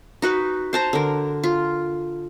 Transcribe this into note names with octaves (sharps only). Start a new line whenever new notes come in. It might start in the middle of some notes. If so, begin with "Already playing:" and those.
D#4 F#4 B4
C5 A5 A#5
D3 A#4
F4